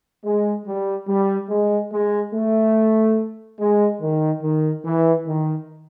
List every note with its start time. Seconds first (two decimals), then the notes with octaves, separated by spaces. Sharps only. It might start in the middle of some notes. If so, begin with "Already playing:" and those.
0.24 G#3
0.66 G3
1.08 G3
1.49 G#3
1.92 G#3
2.34 A3
3.59 G#3
4.01 D#3
4.42 D#3
4.84 E3
5.26 D#3